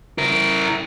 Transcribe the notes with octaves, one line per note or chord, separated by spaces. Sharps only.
E4 A#4